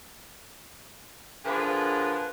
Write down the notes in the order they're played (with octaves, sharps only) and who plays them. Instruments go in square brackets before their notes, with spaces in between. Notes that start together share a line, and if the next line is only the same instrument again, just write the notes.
[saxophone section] D3 F3 G#4 A#4 B4